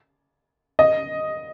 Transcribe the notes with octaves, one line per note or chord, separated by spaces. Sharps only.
D#5